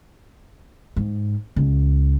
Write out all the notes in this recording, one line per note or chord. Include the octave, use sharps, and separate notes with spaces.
G#2
C#2